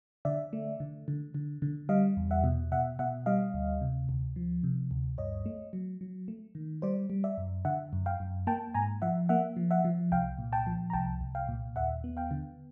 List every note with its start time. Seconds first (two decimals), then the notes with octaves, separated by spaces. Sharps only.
0.25 D3 D5 E5
0.53 A3
0.80 D3
1.08 D3
1.34 D3
1.62 D3
1.89 G3 D#5 F5
2.17 E2
2.31 E5 F#5
2.44 B2
2.72 B2 E5 F#5
2.99 B2 E5 F#5
3.26 G3 D#5 F5
3.54 D2
3.81 C3
4.09 D2
4.36 F3
4.64 C3
4.91 D2
5.18 G2 C#5 D#5
5.46 A3
5.73 F#3
6.01 F#3
6.28 A3
6.55 D#3
6.82 G3 C5 D5
7.10 G3
7.24 D5 E5
7.38 F#2
7.65 D3 E5 F#5
7.93 F#2
8.06 F5 G5
8.20 F#2
8.47 A#3 G5 A5
8.74 G#2 G#5 A#5
9.02 F3 E5 F#5
9.29 A#3 E5 F#5
9.57 F3
9.71 E5 F#5
9.84 F3
10.12 C2 F5 G5
10.39 A#2
10.53 G5 A5
10.67 F3
10.90 A#5
10.93 C2 G5 A5
11.21 C2
11.35 F5 G5
11.48 A#2
11.76 D#2 E5 F#5
12.04 B3
12.17 F5 G5
12.31 D3